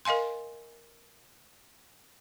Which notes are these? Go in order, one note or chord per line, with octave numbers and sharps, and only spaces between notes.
A#4 D#5 F5 G#5 C6